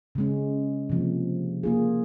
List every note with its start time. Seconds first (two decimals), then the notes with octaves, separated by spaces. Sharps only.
0.15 C#3 G#3 C#4
0.90 C3 F3 A#3
1.63 A#3 F4 G#4